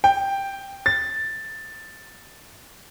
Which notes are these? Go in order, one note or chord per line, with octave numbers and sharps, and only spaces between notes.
G5
A6